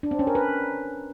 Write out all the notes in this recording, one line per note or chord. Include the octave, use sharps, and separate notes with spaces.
D4
C4
C#4
A#4
B4